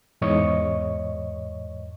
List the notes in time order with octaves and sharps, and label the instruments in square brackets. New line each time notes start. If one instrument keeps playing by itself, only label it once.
[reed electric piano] E2 G#2 C#5 D#5 C#6